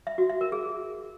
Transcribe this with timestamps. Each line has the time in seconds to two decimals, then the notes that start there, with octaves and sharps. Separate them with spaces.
0.07 E5
0.18 F#4
0.29 E5
0.41 A#4
0.52 G#4